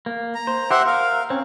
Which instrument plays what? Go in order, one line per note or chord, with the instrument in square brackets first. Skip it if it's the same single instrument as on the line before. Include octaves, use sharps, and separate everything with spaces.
[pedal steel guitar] A#3
[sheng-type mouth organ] A#5
[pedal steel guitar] C5
[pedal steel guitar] G4 C5 [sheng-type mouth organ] E5 F#5 C6
[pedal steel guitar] A#4 [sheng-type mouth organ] F5
[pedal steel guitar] C4 C#4